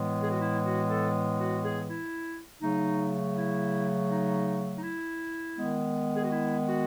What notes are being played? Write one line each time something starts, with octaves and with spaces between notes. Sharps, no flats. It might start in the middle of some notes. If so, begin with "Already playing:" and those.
Already playing: A2 E3 G#3 B3
G#4
F#4
E4
F#4
A4
F#4
G#4
E4
C#3 F#3 A3 D#4
E4
D#4
D#4
E4
D#3 G#3 B3
G#4
F#4
E4
F#4